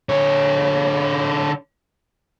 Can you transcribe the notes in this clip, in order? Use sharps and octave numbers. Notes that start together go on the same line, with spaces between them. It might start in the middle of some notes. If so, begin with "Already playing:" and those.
D3 C#5